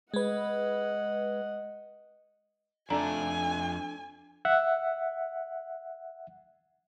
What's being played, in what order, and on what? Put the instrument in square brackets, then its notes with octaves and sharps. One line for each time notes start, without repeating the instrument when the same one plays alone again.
[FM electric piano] G#3 B4 [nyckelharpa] D#5 F#5
[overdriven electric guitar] F2 A3 [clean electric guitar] D4 A4 [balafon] D5 A#5 [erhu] G#5
[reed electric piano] E5 F#5